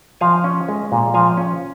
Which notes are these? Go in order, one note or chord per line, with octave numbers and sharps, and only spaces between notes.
F3 F5 G#5
C#4
G#3
A#2
F3 F5 G#5
C#4